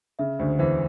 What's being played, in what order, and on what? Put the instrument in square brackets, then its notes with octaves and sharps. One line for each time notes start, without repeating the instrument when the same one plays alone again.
[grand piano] C#3 [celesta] E5
[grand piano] D2 D3 [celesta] C5
[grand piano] E2 E3 [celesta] C5